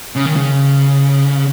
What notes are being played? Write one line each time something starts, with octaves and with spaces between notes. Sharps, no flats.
C#3
D#3
C#3